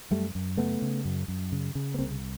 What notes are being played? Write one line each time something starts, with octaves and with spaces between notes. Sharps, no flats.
F#2 G3 A3
F#2
C#3 A3 B3
C#3
F#2
F#2
C#3
C#3
B3
C2 A#3 C4